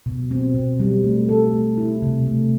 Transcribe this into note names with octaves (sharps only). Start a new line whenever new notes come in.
B2
C4
B2
G3
A3
A4
A3
E4
C3
A3